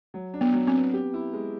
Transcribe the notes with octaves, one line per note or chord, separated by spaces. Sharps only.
F#3
D4
B3
F#3
C4
B3
G4
E4
G#3